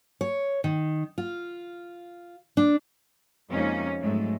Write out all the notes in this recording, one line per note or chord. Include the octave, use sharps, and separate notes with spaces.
C#5
D#3
F4
D4
F2 C3 G#3 A#3 C#4 D#4
G#2 F#3 G#3 A3